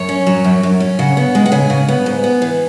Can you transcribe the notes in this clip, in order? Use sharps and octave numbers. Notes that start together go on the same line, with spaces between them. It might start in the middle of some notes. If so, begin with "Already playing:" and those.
Already playing: F#2 C#5
C#4
F#3
F#2
F#2
C#4
C#3 F#5
B3
G#3
F#5
C#3 G#5
C#3
B3
G#2
B3
E3